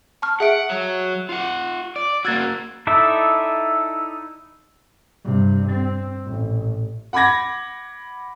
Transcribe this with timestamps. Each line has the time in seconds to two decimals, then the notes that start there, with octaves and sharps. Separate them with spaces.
0.22 A5 C#6 F6
0.40 G#4 E5 F#5 D7
0.69 F#3
1.29 F4 F#5
1.96 D5
2.25 A#3 F#4 E6 G#6 A6
2.87 D#4 E4 A4 D5 E5
5.24 G2 C3
5.70 C4
6.25 A1 A#2
7.13 F#5 B5 D6 G#6 A#6